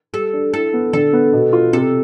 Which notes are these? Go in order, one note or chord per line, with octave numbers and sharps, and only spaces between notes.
G3 A4
D4
E4 A4
B3
D3 A4
B3
B2
F4
C3 A4